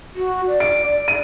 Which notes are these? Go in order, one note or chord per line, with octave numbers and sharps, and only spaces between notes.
F#4
D5
D7
D#7